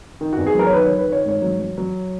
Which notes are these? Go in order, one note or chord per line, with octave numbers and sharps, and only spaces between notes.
D#3
E2 F#4
G#4
F#3 A#4
C#5
D#3 B4
C#5
D#3
B4
D#3 C#5
G#2 C#5
F#3
F#3
F#3